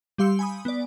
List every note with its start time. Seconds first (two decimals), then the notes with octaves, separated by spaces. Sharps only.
0.18 G3 G4 F5 C6 E6 C#7
0.39 G#5 B5 D#6
0.65 B3 D5